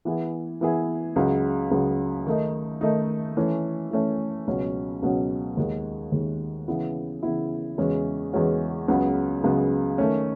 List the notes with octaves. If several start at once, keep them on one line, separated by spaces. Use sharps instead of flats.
E3 B3 E4 G#4
E3 B3 E4 G#4
C#2 C#3 F#3
C#2 C#3 F#3
D#3 A3 D#4
D#3 A3 D#4
E3 A3 C#4
E3 A3 C#4
C#2 B2 F#3 C#4
C#2 B2 F#3 C#4
D#2 D#3 G#3
D#2 D#3 G#3
C#3 E3 B3 E4
C#3 E3 B3 E4
E2 C#3 G#3 C#4 F#4
E2 C#3 G#3 C#4 F#4
C#2 C#3 F#3 B3
C#2 C#3 F#3 B3
D#3 A3 C#4